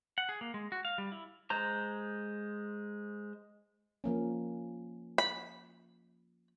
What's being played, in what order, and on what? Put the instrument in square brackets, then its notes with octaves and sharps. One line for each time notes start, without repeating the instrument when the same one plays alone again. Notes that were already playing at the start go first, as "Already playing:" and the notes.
[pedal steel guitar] F#5
G#4
A#3
G#3
F#4
F5
G3
E4
G#3 C5 A#5
[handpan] F3 A#3 C#4
[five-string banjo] B5